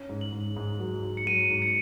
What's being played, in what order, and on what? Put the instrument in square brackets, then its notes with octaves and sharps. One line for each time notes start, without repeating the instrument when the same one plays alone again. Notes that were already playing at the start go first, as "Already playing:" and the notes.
Already playing: [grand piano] C#4
G#2
[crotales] F#7
[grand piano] G#2
G#2
F#3
G#2
[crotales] C#7
[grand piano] F#3 [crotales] D#7
[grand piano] G#2
[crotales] C#7